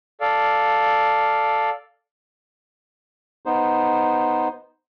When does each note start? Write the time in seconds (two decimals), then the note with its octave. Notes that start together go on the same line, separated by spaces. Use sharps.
0.21 A4 D5 F5
3.46 B3 D#4 C5